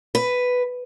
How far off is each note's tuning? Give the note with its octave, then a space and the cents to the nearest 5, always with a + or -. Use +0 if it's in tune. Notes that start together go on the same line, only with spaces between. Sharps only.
B4 +5